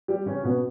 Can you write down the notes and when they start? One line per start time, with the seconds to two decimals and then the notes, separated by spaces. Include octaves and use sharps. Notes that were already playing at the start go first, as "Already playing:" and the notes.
0.08 G3 G4
0.26 C#3 C#4
0.43 B2 B3